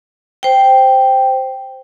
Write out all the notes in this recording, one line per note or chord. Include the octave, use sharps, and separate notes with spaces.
C5 G5